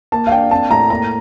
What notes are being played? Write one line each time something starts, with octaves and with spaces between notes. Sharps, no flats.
A#3 A5
F5
D4 G5
C4 A5
A2 A#5
A#3 A#5